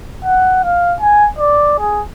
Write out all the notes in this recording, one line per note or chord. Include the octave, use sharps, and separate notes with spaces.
F#5
F5
G#5
D5
G#4